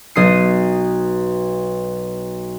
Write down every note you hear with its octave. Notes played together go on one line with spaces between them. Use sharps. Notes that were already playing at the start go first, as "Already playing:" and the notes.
B1 D#6 C7